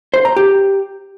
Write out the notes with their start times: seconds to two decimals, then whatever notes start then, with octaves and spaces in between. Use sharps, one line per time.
0.14 C5
0.25 A#5
0.36 G4